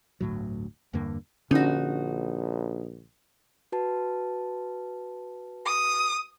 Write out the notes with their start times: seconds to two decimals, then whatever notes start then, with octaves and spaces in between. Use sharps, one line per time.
0.21 G1 D2 A2 F#3
0.93 E2 G2 D3 A#3
1.51 A#1 D3 C#4 D#4 F#4
3.72 F#4 B4 A5
5.66 D#6